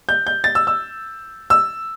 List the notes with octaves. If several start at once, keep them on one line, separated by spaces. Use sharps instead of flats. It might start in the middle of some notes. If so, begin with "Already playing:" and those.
G6
G6
A6
E6
E6
E6